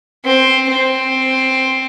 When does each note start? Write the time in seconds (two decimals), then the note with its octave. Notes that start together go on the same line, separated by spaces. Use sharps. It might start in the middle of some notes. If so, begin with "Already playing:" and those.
0.25 C4
0.70 C4